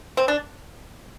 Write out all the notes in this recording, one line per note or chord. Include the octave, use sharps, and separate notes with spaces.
C4
D4